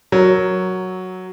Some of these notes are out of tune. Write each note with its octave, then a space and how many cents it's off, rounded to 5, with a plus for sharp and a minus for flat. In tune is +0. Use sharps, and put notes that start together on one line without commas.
F#3 +0 A#4 +0